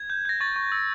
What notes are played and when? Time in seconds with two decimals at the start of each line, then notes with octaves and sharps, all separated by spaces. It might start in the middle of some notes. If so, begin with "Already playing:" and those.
Already playing: G#6
0.10 G6
0.25 G6 A#6
0.41 C#6 A6
0.56 C#6
0.72 E6